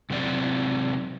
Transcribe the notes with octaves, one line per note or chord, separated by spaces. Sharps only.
C3 F#3 C4 D5